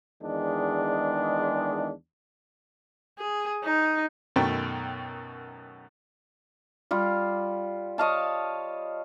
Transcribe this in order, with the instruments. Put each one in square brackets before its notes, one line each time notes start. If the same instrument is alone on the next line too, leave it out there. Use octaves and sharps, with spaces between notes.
[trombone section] E2 D#3 G#3 D4
[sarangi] G#4
D#4
[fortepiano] F#2 B2 D#3 A3 G5
[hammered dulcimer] G3 F4
C#5 D#5 F5 A5